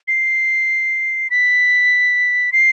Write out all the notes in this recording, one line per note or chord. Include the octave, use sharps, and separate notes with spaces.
C7
B6
C7